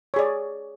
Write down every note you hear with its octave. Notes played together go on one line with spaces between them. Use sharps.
G#4 C#5 D5